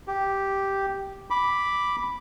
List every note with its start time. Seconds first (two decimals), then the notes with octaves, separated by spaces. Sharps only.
0.07 G4
1.30 B5 D6